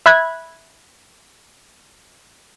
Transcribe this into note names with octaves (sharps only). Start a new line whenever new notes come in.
E5 B5 F#6 G#6